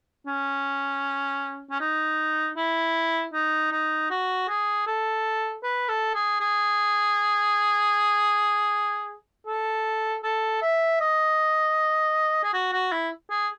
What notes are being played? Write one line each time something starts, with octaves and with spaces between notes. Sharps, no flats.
C#4
C#4
D#4
E4
D#4
D#4
F#4
G#4
A4
B4
A4
G#4
G#4
A4
A4
E5
D#5
G#4
F#4
F#4
E4
G#4